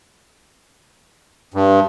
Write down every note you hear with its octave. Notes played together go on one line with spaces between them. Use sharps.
G2